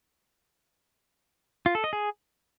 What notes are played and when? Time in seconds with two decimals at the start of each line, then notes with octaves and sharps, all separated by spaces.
1.66 F4
1.75 A4
1.84 D#5
1.93 G#4